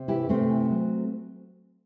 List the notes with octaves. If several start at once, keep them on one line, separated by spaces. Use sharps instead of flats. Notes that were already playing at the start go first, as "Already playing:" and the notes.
Already playing: C3
E3 E4 G4
C3 A3 C4
E3
F#3